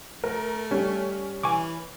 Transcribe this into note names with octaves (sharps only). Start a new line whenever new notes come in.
A3 A#4
G3 C#4
E3 G#5 C#6 D6